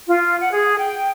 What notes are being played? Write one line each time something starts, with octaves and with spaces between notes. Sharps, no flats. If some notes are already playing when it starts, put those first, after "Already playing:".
F4
F#5
G#4
G5